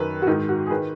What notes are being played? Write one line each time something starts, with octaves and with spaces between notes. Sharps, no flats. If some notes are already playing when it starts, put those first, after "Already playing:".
Already playing: F#2 D#3 B4
F#4
G#2 D#3 D#4
F#4
G#4
D#3 B4